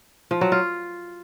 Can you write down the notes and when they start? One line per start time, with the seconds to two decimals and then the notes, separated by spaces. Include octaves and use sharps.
0.31 F3
0.41 F#3
0.52 F4